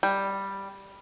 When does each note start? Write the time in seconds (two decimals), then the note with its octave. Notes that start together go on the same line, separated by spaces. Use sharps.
0.03 G3